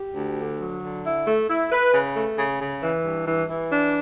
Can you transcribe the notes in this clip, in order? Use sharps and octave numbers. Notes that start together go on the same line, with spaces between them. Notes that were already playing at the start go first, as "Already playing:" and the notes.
Already playing: G4
D2
D3
F#3
D3
E4
A3
E4
B4
C#3
A3
C#3
C#3
E3
G2
E3
E3
D4